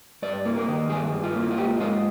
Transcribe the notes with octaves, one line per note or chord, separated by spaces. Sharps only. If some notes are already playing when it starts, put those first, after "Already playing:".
G2 D5
A#3
A#4
D#3
G2 G#4
G2
F4
A#3
F4
G#2 G4
G#3 F4